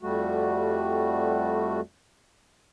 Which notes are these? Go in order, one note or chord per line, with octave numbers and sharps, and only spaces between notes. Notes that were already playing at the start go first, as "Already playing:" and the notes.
F2 G3 A3 F#4